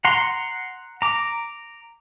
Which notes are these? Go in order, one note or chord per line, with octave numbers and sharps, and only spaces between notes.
F#5 A#5 C6
A#5 D6